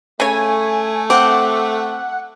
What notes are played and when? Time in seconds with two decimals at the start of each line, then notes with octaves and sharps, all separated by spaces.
0.20 C#3 A3 C#5 G#5
1.10 C4 F#5 D6